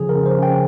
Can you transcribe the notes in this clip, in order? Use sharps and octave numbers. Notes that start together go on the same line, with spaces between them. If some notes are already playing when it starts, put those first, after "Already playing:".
Already playing: C#3 F3 G#4
A#4
C#3
C5
C#3 G5